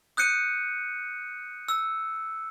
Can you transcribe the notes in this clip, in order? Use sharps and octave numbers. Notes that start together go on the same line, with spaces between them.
D#6 F#6 G6 C#7 D#7
E6